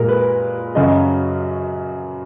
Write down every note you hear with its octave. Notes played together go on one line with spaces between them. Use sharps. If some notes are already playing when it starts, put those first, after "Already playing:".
Already playing: A#2 G#3 A#4
B4
F#2 C#3 F#3 D#5